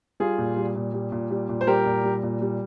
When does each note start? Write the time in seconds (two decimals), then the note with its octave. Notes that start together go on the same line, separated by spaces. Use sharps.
0.20 G3 F4 G#4
0.38 A#2
0.57 G3
0.75 A#2
0.94 G3
1.12 A#2
1.31 G3
1.49 A#2
1.61 C5
1.67 G3 G4 A#4
1.86 A#2
2.04 G3
2.23 A#2
2.42 G3